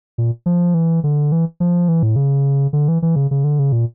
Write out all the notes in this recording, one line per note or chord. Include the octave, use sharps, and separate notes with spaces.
A#2
F3
E3
D3
E3
F3
E3
A2
C#3
D3
E3
E3
C#3
C#3
D3
C#3
A#2